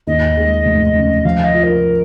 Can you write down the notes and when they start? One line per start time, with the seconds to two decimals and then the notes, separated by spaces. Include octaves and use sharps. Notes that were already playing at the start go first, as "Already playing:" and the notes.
0.07 D#2 D#5
0.37 G#3
0.65 F1
0.96 C#3
1.24 F3 F5
1.44 D#5
1.54 F4
1.64 A#4